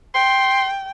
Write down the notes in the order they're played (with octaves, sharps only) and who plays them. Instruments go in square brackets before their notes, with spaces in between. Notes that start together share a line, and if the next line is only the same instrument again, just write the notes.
[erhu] G5 [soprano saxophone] C6